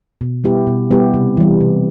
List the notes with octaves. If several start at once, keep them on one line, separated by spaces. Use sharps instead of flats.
B2
G3 B3 E4 G4
B2
G3 B3 E4 G4
C3
E3 G3
C3